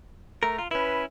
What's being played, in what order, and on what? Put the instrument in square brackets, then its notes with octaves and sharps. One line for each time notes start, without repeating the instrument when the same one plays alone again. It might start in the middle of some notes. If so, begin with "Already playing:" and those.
[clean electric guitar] A3 A#4 [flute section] A#5
[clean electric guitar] F4
[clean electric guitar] C#4 E4 [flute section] B4